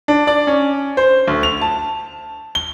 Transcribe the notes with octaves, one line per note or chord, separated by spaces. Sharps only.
D4
D5
C#4
C5
D2
F7
A5
G7